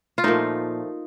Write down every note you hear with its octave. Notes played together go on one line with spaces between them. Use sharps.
F4
A#2 F3 A3 D#4